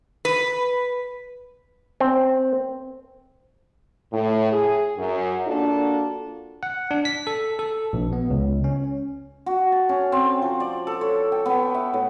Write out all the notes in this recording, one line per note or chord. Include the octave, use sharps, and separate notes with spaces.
B4
C4
A2
G#4
F#2
A#3 D4 F4 F#4 A4
F#5
D4
B6
A4
A4
A#1
B3
C#2
C#4
F#4
A5
C#4
C4
F3
D5
A4
C#5
G5
B3
E5
A2